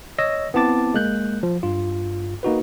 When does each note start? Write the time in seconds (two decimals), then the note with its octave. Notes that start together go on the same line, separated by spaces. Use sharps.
0.18 C#5 D#5 E6 A#6
0.54 B3 C4 E4 A5 D6 A6
0.94 G#3 A#3 F#6 G6
1.43 F3
1.63 G2 F4
2.43 A#3 D#4 F#4 B4